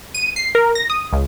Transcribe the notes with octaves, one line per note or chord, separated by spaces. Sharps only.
D#7
C7
A#4
A#6
D#6
C#2